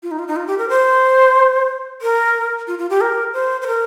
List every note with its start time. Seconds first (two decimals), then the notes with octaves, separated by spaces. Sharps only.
0.03 F4
0.11 D#4
0.19 F4
0.28 D#4
0.36 F4
0.47 G4
0.58 A#4
0.69 C5
2.02 A#4
2.67 F4
2.79 F4
2.90 G4
3.01 A#4
3.34 C5
3.62 C5
3.67 A#4